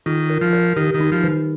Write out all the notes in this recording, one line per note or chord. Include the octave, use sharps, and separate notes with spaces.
D#3 F4
A#4
F3
A#4
D#3 G4
D#3
D#4
F3
D#3